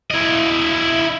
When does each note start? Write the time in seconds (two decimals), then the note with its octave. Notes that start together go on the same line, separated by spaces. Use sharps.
0.11 E4 D#5